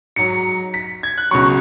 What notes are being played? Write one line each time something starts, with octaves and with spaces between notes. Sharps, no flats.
G#2 F#3 C#7
B6
G#6
F#6
C#2 B2 F#3 C#6